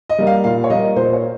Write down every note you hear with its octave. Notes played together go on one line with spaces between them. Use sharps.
D#5
G3 A#3
F5
A#2 F5
C#5
G3 A#3 D#5
A#2 C5
C#5